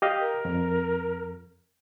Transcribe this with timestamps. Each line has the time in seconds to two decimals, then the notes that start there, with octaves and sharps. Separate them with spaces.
0.02 G4 D#5 F5
0.20 A#4
0.45 F2